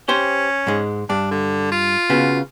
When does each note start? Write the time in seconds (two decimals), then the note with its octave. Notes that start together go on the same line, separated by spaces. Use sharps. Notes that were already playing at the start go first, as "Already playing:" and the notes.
0.09 C#4 G4 C5
0.67 G#2 G#3
1.09 G2 D4
1.31 D3
1.72 F4
2.10 C#3 B3 F#4